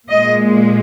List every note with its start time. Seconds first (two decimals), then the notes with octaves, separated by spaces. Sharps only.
0.09 A#2 G#3 D#5